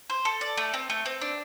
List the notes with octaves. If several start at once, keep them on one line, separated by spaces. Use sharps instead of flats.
C5
A4
D5
A3
C4
A3
C4
D4